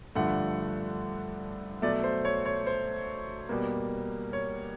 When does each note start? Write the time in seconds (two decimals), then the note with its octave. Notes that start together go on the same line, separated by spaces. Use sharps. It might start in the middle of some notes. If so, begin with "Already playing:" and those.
0.15 G2 D3 F3 A3 F#5
1.82 B2 F#3 A3 D5
2.04 C5
2.25 C#5
2.45 C#5
2.67 C5
3.49 B2 G3 A#3
4.33 C#5